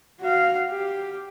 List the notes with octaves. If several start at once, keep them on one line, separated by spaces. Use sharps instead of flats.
F#4 F5
G4